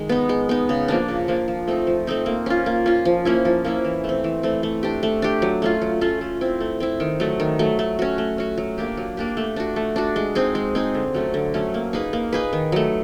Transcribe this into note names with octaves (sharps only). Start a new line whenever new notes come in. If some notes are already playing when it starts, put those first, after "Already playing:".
Already playing: D#3 G#3
B3 D#4
G#3
B3 D#4
C#3
F3 A#3 D4
C#3
F3 A#3 D4
F3
A3 C4 D#4
F3
A3 C4 D#4
A#3
C#4 F4
A#3
C#4 F4
F3
A#3 C#4 E4
F3
A#3 C#4 E4
E3
A3
C4
E3
A3 C4
A3
D4 G4
A3
D4 G4
F#3
A3 C#4 F4
F#3
A3 C#4 F4
A3
C4 E4
A3
C4 E4
D#3
F#3 A3
D#3
F#3 A3
A3
C#4 F#4
A3
C#4 F#4
F#3
A#3 D4 G4
F#3
A#3 D4 G4
A3
D4 F#4
A3
D4 F#4
G#3
C4 D#4 G#4
G#3
C4 D#4 G#4
D3
F#3 A3 C#4
D3
F#3 A3 C#4
A#3
D#4 G#4 B4
A#3
D#4 G#4 B4
D#3
F#3 A3